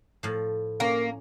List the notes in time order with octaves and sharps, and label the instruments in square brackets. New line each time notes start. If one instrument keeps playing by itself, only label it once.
[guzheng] A2 F3
[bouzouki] A#3 [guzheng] C#4 [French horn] A#4